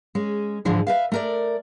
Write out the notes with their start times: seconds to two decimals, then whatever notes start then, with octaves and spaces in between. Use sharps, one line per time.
0.15 G#3 C#4
0.65 G#2 D3 E3 F3 G#3
0.87 B4 E5 F5
1.12 A3 A#4 D5